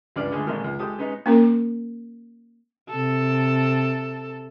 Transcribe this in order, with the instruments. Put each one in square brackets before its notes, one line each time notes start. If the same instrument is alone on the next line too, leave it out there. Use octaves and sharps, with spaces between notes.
[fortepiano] C#2 G2 C#4 D5 F6
D3 G#3 A3 G#4
G#1 A#2 D#3 G#3 A4 F6
C#2
G#3 G4 A4 D#6
G#3 B3 C#4 D#4
[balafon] A#3 C#4 A#4
[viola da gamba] C3 A4